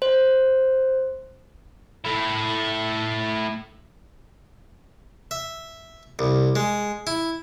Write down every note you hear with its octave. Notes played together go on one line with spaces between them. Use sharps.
C5
A3 E4
E5
C2
G#3
E4